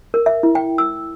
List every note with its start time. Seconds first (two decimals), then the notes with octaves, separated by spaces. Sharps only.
0.14 A#4
0.26 E5
0.43 E4
0.55 G5
0.78 E6